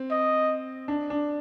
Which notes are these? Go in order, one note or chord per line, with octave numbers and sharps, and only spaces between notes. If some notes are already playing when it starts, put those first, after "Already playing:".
Already playing: C4
D#5
D4
D4